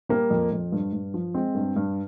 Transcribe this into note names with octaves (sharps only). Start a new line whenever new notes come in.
G3 A#3
F2
F2
G2
G2
F3
G#3 C4
G2
G2